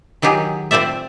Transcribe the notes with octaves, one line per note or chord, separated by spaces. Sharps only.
D#3 F#3 F4 G4 G#4
C4 F4 C5 D5 E5